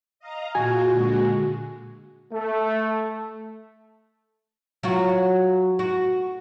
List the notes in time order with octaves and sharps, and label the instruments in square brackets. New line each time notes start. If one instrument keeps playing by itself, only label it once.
[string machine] D#5 F5 A#5
[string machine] A#2 F4 G#4 [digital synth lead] F#4 [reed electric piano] G#5
[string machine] A#2 D3 G#3
[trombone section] A3
[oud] F#3 F4 F#4
F#4